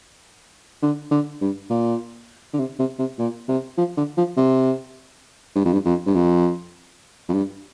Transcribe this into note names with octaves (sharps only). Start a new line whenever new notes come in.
D3
D3
G2
A#2
D3
C3
C3
C3
A#2
C3
F3
D3
F3
C3
G2
F2
G2
F2
G2
F2
F2
G2